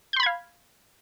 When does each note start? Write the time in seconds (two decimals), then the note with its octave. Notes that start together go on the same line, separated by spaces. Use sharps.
0.13 G6
0.16 C6
0.20 B5
0.23 G#6
0.26 F5